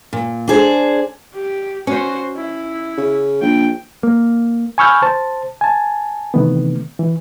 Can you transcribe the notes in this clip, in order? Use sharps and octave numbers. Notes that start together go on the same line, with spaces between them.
A#2
D4 G#4 C5
G4
C#4 F#4 C5
E4
C#3
A#1 G5
A#3
G#5 B5 C#6 E6 F6 G6
C5 A5
G#5 A5
C3 D#3 E3 A3 B3
E3